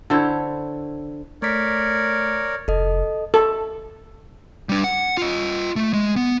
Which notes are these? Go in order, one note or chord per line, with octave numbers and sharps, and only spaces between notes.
D3 E4 C5 C#5
A3 A#4 C#5 D5 B6
F1 A4 D#5
A4
G3 D4
F#5
F4 D#5
A3
G#3
B3